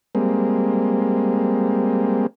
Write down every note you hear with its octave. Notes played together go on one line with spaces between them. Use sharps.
G3 G#3 A#3 C4